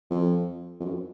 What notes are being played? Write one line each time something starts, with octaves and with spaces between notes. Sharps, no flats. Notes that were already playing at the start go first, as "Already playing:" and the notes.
F2
F2
F#2